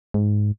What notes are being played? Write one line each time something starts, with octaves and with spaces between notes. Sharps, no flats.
G#2